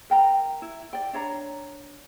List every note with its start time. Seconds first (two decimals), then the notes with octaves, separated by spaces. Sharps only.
0.10 A#4 G5 A#5
0.62 E4
0.93 D5 G5
1.13 D4 C#5 A#5